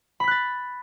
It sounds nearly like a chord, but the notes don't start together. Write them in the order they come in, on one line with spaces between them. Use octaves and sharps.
B5 B6 F#6 A6